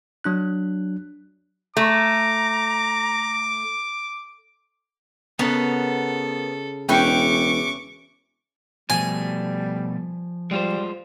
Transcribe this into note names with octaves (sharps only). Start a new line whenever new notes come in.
F#3 D4 F#6
A3 A#5 D6
C#3 B3 A4 A#4 F#5
E1 C#4 E4 B4 G5 C#6 D6
B2 F3 G3 A3 G#5
G3 G#3 F4 C5